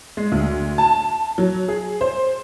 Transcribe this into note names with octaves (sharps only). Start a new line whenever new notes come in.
G#3
D2
A5
F#3
G#4
C5